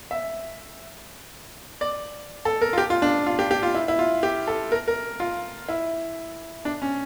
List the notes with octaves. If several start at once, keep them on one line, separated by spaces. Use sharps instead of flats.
E5
D5
A4
A#4
F4
G4
F4
D4
F4
G4
G4
F4
E4
E4
F4
G4
A4
A#4
A#4
F4
E4
D4
C#4